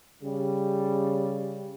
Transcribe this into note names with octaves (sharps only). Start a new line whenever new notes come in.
C#3 G3